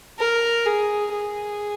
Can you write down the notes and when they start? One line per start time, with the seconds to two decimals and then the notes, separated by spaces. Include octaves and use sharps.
0.19 A#4
0.66 G#4
1.12 G#4